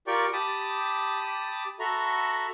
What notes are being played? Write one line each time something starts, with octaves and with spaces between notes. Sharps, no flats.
F4 G4 A#4 D5 G5 C#6
G4 A5 B5 D6 D#6
F#4 A4 E5 A#5 B5